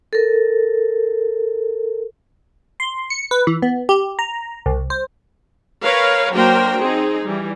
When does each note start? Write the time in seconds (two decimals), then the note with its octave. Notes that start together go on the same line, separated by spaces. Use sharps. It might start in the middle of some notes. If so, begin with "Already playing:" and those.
0.13 A4 A#4
2.80 C6
3.10 C#7
3.31 B4
3.47 E3
3.62 B3
3.89 G4
4.19 A#5
4.66 C2
4.90 C5
5.83 A#4 B4 C#5 F5
6.34 F#3 A#3 D4 A#4 C5 G5
6.82 C4 D#4 G#4
7.25 E3 G3